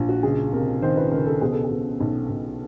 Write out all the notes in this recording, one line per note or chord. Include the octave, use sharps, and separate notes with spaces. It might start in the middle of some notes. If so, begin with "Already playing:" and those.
Already playing: A#1
F#4
C#2 G#4
C3 A#4
D#3 C5
B4
C#2 A#4
A4
B2 G#4
A4
G#4
B2
B1
B1